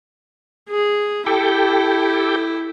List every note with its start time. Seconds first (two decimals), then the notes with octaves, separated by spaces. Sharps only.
0.69 G#4
1.26 E4 G4 A4 G5